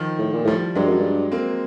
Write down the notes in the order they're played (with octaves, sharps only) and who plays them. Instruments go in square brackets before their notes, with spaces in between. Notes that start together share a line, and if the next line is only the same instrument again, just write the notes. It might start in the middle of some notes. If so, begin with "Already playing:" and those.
Already playing: [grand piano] D#3 F3
[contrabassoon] A2
A#2
[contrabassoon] A2 [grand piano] F3 G3
[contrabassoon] G2 [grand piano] F#3 G#3
[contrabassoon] F#2
G2
[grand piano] A#3 C4